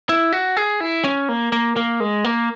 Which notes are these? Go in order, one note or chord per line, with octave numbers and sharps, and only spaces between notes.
E4
F#4
G#4
E4
C#4
A#3
A#3
A#3
G#3
A#3